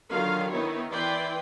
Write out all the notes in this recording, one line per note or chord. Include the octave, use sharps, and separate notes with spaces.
D3 D#3 F#3 D#4 F4 F5
D#3 B3 D#4 E4 C#5
E3 E4 B4 D5 G5 C6